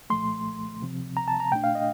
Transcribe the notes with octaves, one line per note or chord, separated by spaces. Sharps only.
C2 A#2 F3 A3 C6
D2 C3 F3 C4
A#5
A5
A#5
A#2 A3 D4 G5
F5
D#5